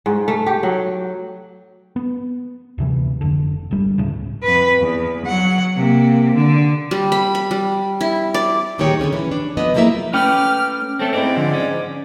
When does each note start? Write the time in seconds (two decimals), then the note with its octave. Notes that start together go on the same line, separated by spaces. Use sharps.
0.06 G#2
0.28 A3
0.46 G4
0.63 F#3
1.96 B3
2.78 D2 C3 E3
3.21 F1 D3
3.71 G#1 G3
3.98 D2 A2 C#3
4.43 F2 B4
4.80 E2
5.25 F#3 F#5
5.76 C3 A#3
6.35 D3
6.91 G3
7.12 B5
7.35 B5
7.51 G3
8.01 E4
8.34 D5
8.78 D2 A#2 D#3 G#3 G4 C#5
9.00 D3 G3 C#4 G#4
9.13 E3 C#4
9.31 D4
9.57 F3 B3 D#5
9.74 F3 F#3 G#3 A#3 E4 E5
10.13 A3 C#4 B4 G5 D6 F6
10.99 A3 C4 C#4 A4
11.13 G#2 C4 E4 D5
11.36 D3 F3
11.54 C#4